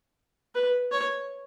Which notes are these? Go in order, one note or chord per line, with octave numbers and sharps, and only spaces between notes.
B4
C#5